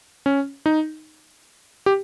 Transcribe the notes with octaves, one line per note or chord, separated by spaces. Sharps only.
C#4
D#4
G4